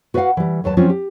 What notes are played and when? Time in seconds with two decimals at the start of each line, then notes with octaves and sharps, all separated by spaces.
0.14 F#4 B4 D5 D#5 F5 F#5
0.37 E3 G3
0.64 D#2 F#3 B4 A5
0.77 F3 F#3 C4 C#4 F4
0.90 G4